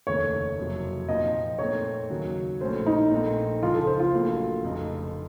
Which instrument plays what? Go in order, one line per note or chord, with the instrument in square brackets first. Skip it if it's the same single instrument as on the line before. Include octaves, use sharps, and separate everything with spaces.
[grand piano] F1 D#2 C#3 A3 [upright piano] C#5
[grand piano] F#1 F2 C3 F#3
[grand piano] A#2 F3 C4 D#4 [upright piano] D#5
[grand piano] A#2 A3 C4 D#4 [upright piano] C#5
[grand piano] D#2 C#3 F#3
[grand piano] A#1 A2 A3 C#4 [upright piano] C5
[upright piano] D#4
[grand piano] A#1 A#2 A3 C4
[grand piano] C#2 C#3 F3 [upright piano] F4
[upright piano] A4
C5
F4
[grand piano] A#1 A#2 F#3 A3
F1 F2 C#3 A3 D#4